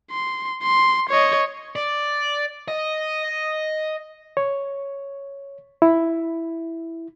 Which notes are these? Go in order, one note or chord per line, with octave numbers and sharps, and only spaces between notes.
C6
C6
C#5 D#5
D5
D#5
C#5
E4